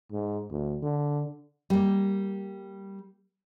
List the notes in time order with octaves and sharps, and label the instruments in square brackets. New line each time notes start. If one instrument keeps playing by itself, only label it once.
[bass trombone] G#2
D2
D3
[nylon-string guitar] G3 A#3